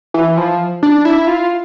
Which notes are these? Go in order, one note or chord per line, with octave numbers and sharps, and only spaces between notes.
E3
F3
D4
E4
F4